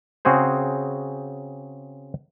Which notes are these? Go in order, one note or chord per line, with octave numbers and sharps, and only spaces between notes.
C#3 C4 F#4 G#4 C5